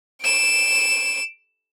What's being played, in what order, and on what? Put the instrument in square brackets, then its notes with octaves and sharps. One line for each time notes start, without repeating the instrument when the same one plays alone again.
[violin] D7 E7